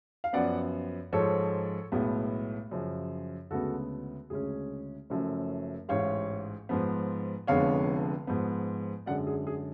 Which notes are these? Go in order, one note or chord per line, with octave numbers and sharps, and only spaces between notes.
F5
F#2 F3 B3 D5 F#5
G#2 F3 G#3 A4 C#5
B1 A2 G#3 B3
F#2 C#3 F3
D2 C#3 G#3 B3 F#4 A4
D2 C#3 G#3 C#4 G#4
F#1 F#2 F3 A3 C#4
A1 G#2 G#3 C#5 F5
G#2 F3 B3
F1 F2 D3 G#3 B3 C#5 F5
G#2 F3 B3
F#2 D3 G#3 D5 F#5
G#4
G#4